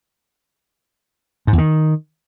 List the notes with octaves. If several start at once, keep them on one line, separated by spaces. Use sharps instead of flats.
G#2
E2
D#3